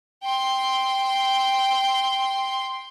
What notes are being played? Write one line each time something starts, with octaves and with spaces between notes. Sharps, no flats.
G5 C6